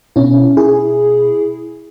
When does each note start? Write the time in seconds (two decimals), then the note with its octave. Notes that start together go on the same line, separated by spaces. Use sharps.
0.16 B2 C#4 E4
0.57 E4 G#4